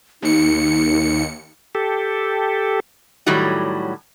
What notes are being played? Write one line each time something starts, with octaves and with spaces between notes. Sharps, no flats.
D#2 D#4 C#7
G4 A4
A2 D#3 F#3 G3 F#4